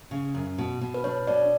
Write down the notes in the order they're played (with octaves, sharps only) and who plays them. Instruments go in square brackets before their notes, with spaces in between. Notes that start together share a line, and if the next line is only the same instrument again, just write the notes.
[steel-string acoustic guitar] C#3
F#2
B2
B2
[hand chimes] B4
[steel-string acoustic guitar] D4 [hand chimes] C#5
[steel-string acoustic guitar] B2 [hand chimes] D5